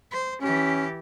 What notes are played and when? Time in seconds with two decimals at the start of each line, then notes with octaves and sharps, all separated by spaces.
0.11 C5
0.42 E3 C#4 G4